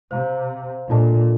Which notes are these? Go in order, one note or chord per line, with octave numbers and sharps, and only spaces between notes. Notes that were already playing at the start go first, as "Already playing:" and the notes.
C3 C5 F5 A#5
A#2 D4 F4 A4 D#5 A5